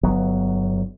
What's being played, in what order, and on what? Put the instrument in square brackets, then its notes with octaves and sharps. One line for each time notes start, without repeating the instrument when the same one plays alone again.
[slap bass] G1 F#3 B3